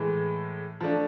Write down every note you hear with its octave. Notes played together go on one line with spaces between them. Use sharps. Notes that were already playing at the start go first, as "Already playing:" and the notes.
Already playing: A2 E3 G#3
F3 A3 D4